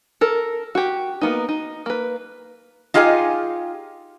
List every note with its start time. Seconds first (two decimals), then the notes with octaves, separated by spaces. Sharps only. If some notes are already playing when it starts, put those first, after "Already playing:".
0.21 A4 A#4
0.75 F#4 G4
1.21 A#3 B3 D#4
1.49 D#4
1.86 A#3 B4
2.94 D#4 F4 G4 G#4 D#5 G#5